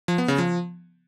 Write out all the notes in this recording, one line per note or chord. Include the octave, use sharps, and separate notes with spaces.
F3
B3
C#3
F3